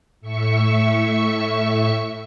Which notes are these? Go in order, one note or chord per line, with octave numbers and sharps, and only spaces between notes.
A2 E5 C#6 C#7